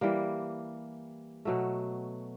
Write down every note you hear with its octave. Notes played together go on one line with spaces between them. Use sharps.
E3 G3 A#3
B2 F#3 A3